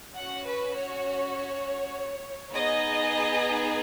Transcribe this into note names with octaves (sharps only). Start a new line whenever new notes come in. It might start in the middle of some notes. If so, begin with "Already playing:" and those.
C#4 F#4 F#5
B4
C#5
B3 D#4 G#4 D#5